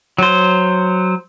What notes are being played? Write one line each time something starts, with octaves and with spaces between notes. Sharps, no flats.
F#3 C5